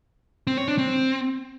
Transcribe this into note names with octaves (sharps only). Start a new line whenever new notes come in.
C4
C#5
D4
C4